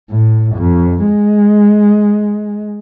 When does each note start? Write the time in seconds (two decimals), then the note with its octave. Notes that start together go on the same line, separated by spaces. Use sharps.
0.10 A2
0.55 F2
1.05 G#3